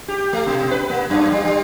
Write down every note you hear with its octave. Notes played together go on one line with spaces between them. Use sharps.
G4
A3
B2
B4
A#3
F#2
G3
G3